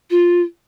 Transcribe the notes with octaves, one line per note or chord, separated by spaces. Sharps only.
F4